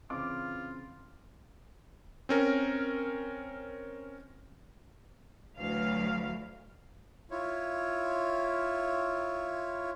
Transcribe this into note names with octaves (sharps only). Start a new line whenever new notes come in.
C#3 E3 C4 F4 D6
C4 C#4 A#4
D2 E3 F#3 F5
E4 F4 C#5